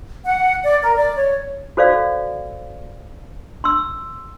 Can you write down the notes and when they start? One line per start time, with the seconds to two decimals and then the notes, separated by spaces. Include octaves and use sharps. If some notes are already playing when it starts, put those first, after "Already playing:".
0.25 F#5
0.64 D5
0.82 A#4
0.95 D5
1.17 C#5
1.77 F#4 A4 C5 D5 F5
3.64 C6 E6